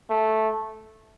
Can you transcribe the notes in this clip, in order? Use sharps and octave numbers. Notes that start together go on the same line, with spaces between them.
A3